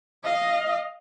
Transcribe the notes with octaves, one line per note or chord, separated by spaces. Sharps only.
D#5 F5